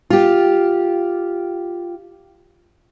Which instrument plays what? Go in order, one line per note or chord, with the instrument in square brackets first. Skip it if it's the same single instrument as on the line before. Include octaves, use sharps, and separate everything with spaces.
[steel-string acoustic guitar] F4 G4